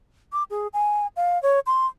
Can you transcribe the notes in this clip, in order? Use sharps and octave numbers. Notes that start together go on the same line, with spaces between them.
D6
G#4
G#5
F5
C#5
C6